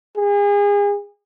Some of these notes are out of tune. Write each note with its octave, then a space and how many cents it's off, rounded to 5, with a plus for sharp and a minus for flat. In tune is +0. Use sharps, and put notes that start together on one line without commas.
G#4 -35